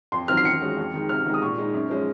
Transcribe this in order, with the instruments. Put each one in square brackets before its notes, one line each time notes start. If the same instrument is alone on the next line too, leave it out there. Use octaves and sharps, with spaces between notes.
[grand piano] F2 [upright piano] C6
[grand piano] D#3 F#3 C4 [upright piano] F6
[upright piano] C7
[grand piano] D#3 [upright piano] C#7
[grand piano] G#3 C#4 F#4
F2
D#3 G#3
[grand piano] C3 [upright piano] F6
[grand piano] D#3 G#3
[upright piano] D#6
[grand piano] A#2 [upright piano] C#6
[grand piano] G#3 D#4
F#2
F3 G#3 C#4